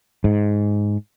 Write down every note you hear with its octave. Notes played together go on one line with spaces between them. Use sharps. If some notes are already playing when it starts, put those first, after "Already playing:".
G#2